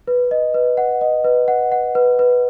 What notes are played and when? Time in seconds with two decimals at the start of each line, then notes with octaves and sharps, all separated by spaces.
0.08 B4
0.31 D#5
0.54 B4
0.77 F#5
1.01 D#5
1.24 B4
1.48 F#5
1.72 F#5
1.95 B4
2.19 B4